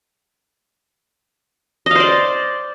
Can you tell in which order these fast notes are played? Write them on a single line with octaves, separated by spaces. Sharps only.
D#5 F5 C5 D5